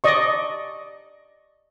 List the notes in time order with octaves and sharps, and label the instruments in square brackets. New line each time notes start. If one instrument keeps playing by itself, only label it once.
[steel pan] D5 D#5 C#6